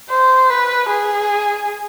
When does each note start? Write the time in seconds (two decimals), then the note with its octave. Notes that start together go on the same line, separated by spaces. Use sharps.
0.10 C5
0.50 B4
0.89 G#4